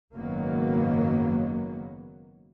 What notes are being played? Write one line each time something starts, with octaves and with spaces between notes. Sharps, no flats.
F#1 G#2 D#3 F#3 A#3 B3